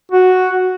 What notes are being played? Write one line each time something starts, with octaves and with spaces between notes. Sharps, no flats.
F#4